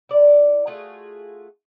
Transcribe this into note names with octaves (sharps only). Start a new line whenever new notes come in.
E4 D5
A3 F4 F#4 G#4